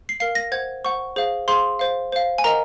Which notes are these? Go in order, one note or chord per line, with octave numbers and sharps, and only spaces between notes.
C7
A#4 F5 C7
A#6
C5 F#5 G#6
C5 F#5 C#6
G#4 C5 F5
G#4 C5 F5 C6
C5 F5
C5 F5
G#5
A#4 D#5 F#5 A#5